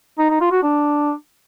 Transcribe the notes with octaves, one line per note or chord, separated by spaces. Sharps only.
D#4
D#4
F4
F#4
D4